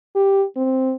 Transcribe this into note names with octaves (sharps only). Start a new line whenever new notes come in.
G4
C4